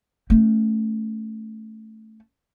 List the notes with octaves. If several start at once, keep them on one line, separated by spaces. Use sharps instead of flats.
A3 C#4